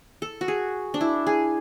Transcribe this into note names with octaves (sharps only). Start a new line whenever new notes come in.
A4
F#4
G#4
D4
E4
G#4